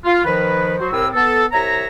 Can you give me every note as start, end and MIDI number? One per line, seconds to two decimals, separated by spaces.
0.05 0.22 65
0.24 0.75 51
0.24 0.75 53
0.24 0.75 71
0.79 0.89 54
0.79 0.89 66
0.79 0.89 72
0.91 1.07 36
0.91 1.07 45
0.91 1.07 60
0.91 1.07 70
0.91 1.07 88
1.14 1.45 59
1.14 1.45 69
1.52 1.86 36
1.52 1.86 73
1.52 1.86 76
1.52 1.86 82